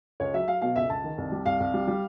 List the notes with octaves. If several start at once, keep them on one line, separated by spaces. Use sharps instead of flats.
C#2 C#5
F#3 E5
F#3 F5
B2 F5
C#2 E5
C#2 A5
D#3
C2
G3
C2 F5
C2
G3
G3